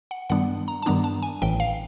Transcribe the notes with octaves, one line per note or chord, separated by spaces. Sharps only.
F#5
G2 D#3 G3 B3 D4 F#5
A#5
A5
G2 D#3 G3 B3 D4 A#5
A5
G#5
A1 A2 E3 G5
F5